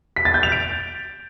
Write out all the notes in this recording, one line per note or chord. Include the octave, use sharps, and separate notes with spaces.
B6
A6
G6
F7
D7